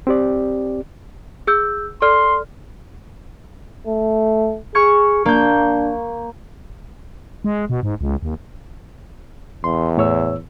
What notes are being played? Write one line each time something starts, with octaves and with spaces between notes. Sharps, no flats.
C4 G4 D5
G#4 E6 G6
A4 D5 C6 F6
A3
G#4 C#6 F6 G#6
A#3 D4 G6
G#3
B2
G#2
C#2
D#2
E2 C6
A2 C#5 E6